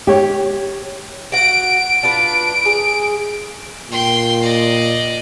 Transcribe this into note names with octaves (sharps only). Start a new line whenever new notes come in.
G4 C#5
F#4 F#5 D7
D4 F4 B4
G#4
A#2 G5 C6
D5 D#5